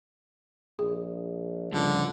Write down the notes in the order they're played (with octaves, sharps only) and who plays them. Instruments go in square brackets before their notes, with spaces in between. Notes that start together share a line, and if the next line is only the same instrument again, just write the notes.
[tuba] A#1 [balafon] G#4
[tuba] C#2 [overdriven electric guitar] G2 F3 [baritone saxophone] D3